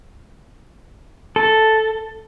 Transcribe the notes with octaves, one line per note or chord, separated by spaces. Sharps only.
A4